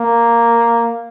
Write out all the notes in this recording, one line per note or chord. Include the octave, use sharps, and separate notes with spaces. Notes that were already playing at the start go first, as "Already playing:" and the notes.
Already playing: A#3